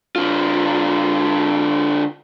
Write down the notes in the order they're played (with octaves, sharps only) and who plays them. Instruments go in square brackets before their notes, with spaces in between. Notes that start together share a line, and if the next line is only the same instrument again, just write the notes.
[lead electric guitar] D3 F4